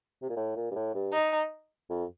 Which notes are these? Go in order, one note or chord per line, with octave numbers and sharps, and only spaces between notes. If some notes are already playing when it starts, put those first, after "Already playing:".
C3
A#2
A2
A#2
G2
A2
G2
D#4
F2